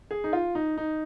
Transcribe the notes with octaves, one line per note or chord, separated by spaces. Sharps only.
G#4
D#4
F4
D#4
D#4